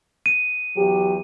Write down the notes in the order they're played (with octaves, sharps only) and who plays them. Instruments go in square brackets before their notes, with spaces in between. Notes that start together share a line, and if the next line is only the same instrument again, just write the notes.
[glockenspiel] D#7
[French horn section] E2 F#3 G4